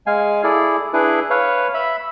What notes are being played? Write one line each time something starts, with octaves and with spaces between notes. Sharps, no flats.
G#3 F5 G#5
E4 G#4 A4 D5
D4 E4 G#4 B4
B4 C#5 F5
E5 B5